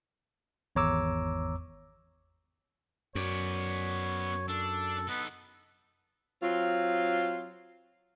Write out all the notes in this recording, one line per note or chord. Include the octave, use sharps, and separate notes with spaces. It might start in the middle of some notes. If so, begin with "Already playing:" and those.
G#1 E2 C#5 A#5 D6 E6
F#2 B3 C#5 D5
D4 A4
B3 D#4 A4
F#3 C4 F4